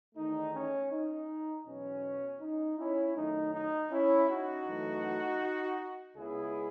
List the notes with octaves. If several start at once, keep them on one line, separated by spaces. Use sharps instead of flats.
E2 D#3 A3 D#4
C#4
D#4
E2 B2 F#3 B3 C#4
D#4
C#4 E4
F#2 D#3 A3 D#4
D#4
C#4 E4
D#4 F#4
F#2 E3 A3
C#2 C#3 G#3 B3 E4 G#4